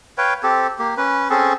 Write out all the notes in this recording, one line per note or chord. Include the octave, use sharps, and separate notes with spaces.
B4 C#5 F5 G5
C4 G4 A4
A#3 G4
C#4 B4
C4 C#4 G#4 A4